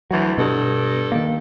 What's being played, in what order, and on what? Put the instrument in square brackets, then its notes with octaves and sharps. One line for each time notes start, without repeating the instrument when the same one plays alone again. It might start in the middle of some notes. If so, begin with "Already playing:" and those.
[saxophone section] D2 E3 [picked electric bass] F#3
[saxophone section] G2 A4 [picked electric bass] B2
[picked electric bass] D#3 A#3